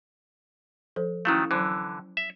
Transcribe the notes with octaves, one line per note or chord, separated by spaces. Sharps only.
F3 A4 C5
D#3 F#3 A3 C#4 E4 F5
D3 E3 F#3 C5
E5